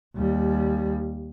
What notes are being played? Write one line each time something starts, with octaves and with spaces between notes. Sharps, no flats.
D#2 G3